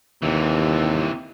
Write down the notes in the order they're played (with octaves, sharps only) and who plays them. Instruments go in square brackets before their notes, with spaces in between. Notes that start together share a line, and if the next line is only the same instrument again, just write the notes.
[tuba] D#2 [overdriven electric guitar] C3 E3